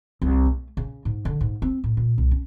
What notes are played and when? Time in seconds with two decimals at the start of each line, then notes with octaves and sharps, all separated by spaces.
0.22 C2
0.46 A3
0.77 C#3
1.05 G#2
1.25 D3
1.41 G#2
1.62 C4
1.84 A2
1.97 A#2
2.18 C2
2.31 C#4